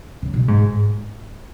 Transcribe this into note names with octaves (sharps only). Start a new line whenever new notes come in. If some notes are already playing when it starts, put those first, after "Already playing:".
C#3
B2
G#2